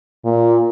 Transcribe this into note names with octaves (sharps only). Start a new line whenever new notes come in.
A#2